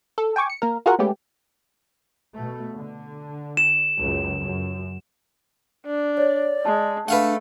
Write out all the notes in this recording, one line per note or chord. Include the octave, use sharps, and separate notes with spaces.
A4
G5 G#5 C#6 D6
C#7
A#3 A#4
F4 F#4 G#4 A#4 F#5
G#3 A3 B3 C#4 G4
B2 A3
D3
E7
C#2 F#2
F#2
D4
C#5 D5
G#3 A5
A3 D4 B4 F5 F#5